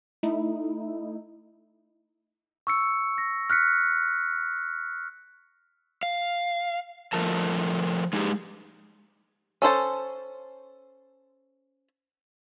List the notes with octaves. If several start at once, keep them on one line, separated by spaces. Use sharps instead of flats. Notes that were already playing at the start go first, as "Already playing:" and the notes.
A3 D#4 E4
C#6 E6 C#7
A#6
F6 F#6 B6 C#7
F5
F3 A3 A#4 A5
G#3 D#4 G4 G#4
C#4 A4 C5 A5